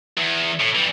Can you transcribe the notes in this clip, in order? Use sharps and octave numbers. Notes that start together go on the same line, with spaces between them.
E2
A2
E3 G3